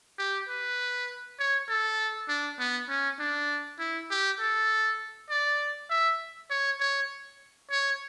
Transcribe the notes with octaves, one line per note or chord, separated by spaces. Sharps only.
G4
B4
C#5
A4
D4
B3
C#4
D4
E4
G4
A4
D5
E5
C#5
C#5
C#5